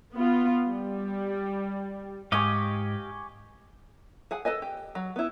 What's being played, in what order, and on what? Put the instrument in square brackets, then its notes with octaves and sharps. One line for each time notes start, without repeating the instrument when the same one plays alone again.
[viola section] B3 F4
G3
[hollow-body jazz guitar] G#2 [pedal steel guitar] G4 D#5 F5 [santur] G#5 C#6 D6
[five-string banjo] G#4 F#5 G#5
A4 B4 D#5 G#5
G4
F#3
B3 E4